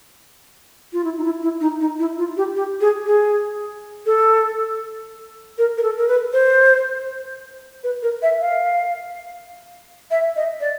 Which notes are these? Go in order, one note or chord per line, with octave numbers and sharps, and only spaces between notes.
F4
E4
D#4
E4
E4
D#4
D#4
E4
F4
G4
G4
G#4
G#4
A4
A#4
A#4
A4
A#4
B4
C5
B4
A#4
E5
F5
E5
D#5
D5